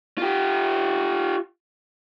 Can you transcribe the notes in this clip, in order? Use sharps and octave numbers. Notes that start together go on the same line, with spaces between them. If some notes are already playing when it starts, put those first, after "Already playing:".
F4 G4